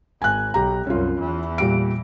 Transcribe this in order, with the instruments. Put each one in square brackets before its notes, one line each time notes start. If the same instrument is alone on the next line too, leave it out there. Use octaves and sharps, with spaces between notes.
[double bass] G#1 [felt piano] G#5 F#6
[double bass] B1 [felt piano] G4 A#5
[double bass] C2 F#2 [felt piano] C#4 F4
[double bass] E2 E3
[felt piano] A#2 G3 D7